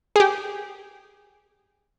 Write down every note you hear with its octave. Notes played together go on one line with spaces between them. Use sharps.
G4 G#4